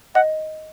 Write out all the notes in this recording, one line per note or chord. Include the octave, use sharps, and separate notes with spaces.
D#5 F#5